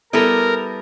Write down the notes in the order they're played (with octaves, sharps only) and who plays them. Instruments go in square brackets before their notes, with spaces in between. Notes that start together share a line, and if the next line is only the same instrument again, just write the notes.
[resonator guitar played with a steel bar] G3 B3 E4 A4 [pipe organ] A#4